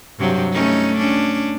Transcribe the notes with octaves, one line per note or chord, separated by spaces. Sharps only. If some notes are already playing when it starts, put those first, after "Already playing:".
G2 C3 F#3
A3 C#4 D#4
C#4 D4